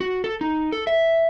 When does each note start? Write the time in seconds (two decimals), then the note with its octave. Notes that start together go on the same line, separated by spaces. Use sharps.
0.01 F#4
0.24 A4
0.41 D#4
0.72 A4
0.87 E5